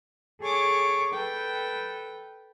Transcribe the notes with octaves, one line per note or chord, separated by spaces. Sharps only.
G#4 A4 C#5 C#6 D6
A4 B4 G5